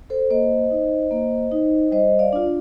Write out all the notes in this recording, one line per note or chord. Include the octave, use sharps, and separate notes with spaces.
A4 C5
A#3 C5 D#5
D#4
A#3
D#4
G3 C5 D#5
D5 F5
D4 F4